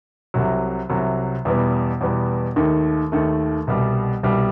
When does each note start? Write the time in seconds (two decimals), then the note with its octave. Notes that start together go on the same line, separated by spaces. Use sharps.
0.34 C2 C3 F#3
0.89 C2 C3 F#3
1.45 E2 B2 G3 B3
2.01 E2 B2 G3 B3
2.56 D#2 D#3 A3
3.12 D#2 D#3 A3
3.67 C2 B2 G3
4.23 C2 B2 G3